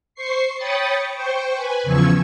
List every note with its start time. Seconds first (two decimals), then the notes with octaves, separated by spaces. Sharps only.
0.15 C5 C#6 C7
0.56 C#5 G5 B5 D#6 A6 C#7
1.14 C5 G5 C#6
1.55 B4 G#5
1.83 E2 C#3 F3 C#6 E6 G#6